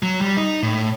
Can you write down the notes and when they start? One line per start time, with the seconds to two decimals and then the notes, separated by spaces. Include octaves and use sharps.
0.03 F#3
0.21 G3
0.37 D#4
0.63 A2